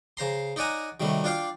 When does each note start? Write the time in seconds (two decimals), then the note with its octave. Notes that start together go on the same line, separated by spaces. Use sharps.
0.17 C#3 C5 A#5 C6
0.56 D#4 C#5 D5 F#5 G#5 A#5
1.00 C3 D#3 F#3 G3 A3
1.24 D4 F4 D5 F5 G5 D6